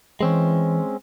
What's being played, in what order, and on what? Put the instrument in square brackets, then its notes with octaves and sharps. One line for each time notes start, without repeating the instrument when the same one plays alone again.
[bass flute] E3 [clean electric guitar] G#3 C4 C#4